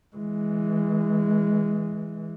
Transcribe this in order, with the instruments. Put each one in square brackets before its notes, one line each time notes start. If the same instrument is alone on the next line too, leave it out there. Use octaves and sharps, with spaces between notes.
[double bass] E3 G#3